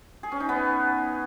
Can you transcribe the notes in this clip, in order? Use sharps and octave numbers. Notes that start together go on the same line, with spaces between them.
G#4
C#4
D#4
B3